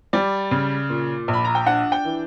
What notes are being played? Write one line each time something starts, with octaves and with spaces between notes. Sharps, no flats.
G3 D5
C#3
A#2
A#1
B5
A#5
G5
D4 F#5
G5
E3